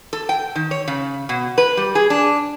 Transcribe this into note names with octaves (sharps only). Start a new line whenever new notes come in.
A4
G5
D#3
C#5
C#3
B2
B4
G3
G#4
D4